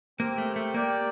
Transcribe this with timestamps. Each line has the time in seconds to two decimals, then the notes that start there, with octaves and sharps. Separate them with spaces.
0.19 A#3 C4 G4 A#4
0.38 A3
0.56 A3
0.74 A#3 G4 A#4 D5 G5